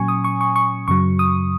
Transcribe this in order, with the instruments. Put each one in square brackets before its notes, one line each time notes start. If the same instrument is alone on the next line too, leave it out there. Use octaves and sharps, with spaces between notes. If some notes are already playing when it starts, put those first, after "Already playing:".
Already playing: [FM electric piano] A#2 F#3 C#4 G#5 C#6
D#6
C#6
C#6
C#6
F#2 C#3 F#3 C#6
D#6